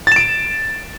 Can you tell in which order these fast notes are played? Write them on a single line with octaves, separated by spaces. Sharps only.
A6 E7 D7